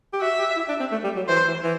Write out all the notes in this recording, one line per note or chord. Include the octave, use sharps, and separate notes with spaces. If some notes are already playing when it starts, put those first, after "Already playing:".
G4
F#4 E5
G4
E4
D4
C4
A3
G3
F#3
E3 C5
E3
E3